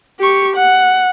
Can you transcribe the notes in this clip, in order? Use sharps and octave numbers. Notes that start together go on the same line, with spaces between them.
G4 C#6
F#5